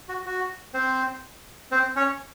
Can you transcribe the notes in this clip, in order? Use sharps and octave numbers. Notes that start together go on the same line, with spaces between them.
F#4
F#4
C4 C5
C4 C5
C#4 C#5